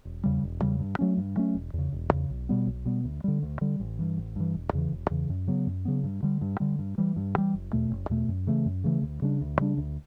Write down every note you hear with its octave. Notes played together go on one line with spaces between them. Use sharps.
E1
E2 C#3 G3
E1
E2 C#3 G3
G2
F#3 A3 C#4
G2
F#3 A3 C#4
E1
E2 C#3
E1
E2 C#3
B1
B2 G3 B3
B1
B2 G3 B3
D2
D3 G3
D2
D3 G3
A1
G2 E3
A1
G2 E3
E1
E2 C#3 E3
E1
E2 C#3 E3
F#2
C#3 F#3 B3
F#2
C#3 F#3 B3
G2
D3 G3
G2
D3 G3
G2
E3 G3
G2
E3 G3
F#1
E2 B2 A3
F#1
E2 B2 A3
F#2
C#3 E3 A3
F#2
C#3 E3 A3
D2
C#3 G3 D4
D2
C#3 G3 D4
D2